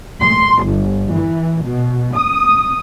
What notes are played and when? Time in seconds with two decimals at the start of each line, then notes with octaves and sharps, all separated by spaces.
0.22 C6
0.65 G1
1.14 E3
1.64 B2
2.16 D#6